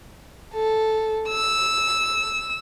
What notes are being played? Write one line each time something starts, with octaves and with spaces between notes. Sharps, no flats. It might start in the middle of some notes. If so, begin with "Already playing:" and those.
A4
E6